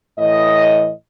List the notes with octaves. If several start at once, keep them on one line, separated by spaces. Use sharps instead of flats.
A2 E3 D#5